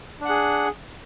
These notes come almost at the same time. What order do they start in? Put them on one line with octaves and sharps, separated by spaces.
D4 F#5 G#4